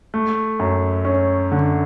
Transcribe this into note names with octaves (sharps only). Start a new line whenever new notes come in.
A3
F#2
C#4
D3